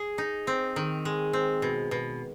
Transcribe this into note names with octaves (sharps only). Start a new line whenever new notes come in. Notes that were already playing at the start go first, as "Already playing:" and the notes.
Already playing: G#4
D#4
C4
D#3
G#3
C4
B2
B2